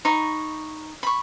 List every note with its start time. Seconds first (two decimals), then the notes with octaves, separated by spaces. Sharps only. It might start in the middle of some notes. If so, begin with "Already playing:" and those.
0.05 D#4 A#5 B5 C#6
1.03 B5 C#6